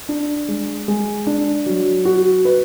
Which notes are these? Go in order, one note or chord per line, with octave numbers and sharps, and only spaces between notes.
D4
G#3
G#3
D4
F#3
F#4
B4